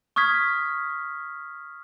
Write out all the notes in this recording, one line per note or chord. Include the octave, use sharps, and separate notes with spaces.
C#6 D#6 F6 G#6 B6